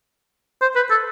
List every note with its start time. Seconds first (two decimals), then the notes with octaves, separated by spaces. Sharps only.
0.62 C5
0.76 B4
0.90 A4